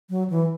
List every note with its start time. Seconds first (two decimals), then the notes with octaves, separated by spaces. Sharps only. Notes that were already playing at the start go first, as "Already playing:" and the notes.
0.10 F#3
0.30 E3